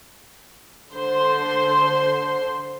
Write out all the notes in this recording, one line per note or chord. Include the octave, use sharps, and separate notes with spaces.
D3 C5 C6